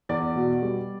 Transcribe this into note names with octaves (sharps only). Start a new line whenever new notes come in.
E2 D5
B2
G3